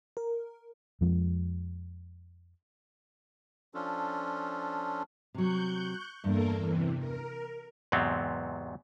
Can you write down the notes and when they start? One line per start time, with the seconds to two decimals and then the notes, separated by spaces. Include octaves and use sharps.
0.17 A#4
1.01 F2 F3 G#3
3.74 F3 C#4 D4 F4 A4
5.34 C3 F#3 C#6 F#6 G6
6.24 E2 G2 A#3 A4 A#4
6.58 C3 E3
6.98 A#4
7.92 E2 G#2 C3 F#3 B3 C4